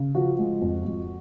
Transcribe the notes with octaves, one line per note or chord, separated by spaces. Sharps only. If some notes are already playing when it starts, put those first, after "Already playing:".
Already playing: C#3
F3 F#4
G#3
F2
F2